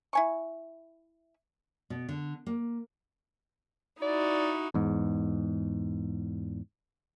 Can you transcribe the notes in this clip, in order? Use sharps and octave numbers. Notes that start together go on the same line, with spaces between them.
E4 G#5 C#6
B2
D3
A#3
D#4 E4 F#4 D5
E2 G#2